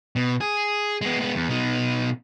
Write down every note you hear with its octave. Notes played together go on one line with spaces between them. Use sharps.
B2
G#4
G#3 B3
G#3 B3
E2
B2 D#4